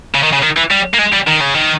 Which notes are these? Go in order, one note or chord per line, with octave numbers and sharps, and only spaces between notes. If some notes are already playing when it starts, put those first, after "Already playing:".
C#3
D#3
C#3
D#3
E3
G3
A#3
G#3
G3
D#3
C#3
D#3